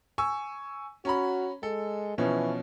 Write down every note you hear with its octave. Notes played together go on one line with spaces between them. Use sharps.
G#5 C#6 E6
C#4 F#4 A#5 B5
G#3 A4
B2 E3 F3 C#4